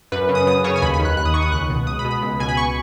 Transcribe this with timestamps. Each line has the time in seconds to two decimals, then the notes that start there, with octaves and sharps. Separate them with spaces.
0.12 F#2 B4
0.29 C#3
0.35 D#6
0.47 F#2 D#6
0.64 C#3 C#5
0.76 G#5
0.82 D#2 B5
0.94 B5
0.99 D#3
1.05 F#6
1.17 D#2 F#6
1.25 D#6
1.34 D#3 C#6
1.42 D#6
1.52 C#2 F#6
1.70 B2
1.87 C#2 D#6
1.99 B5
2.05 B2
2.11 B5
2.22 C#2
2.40 B2 G#5
2.49 B5
2.57 C#6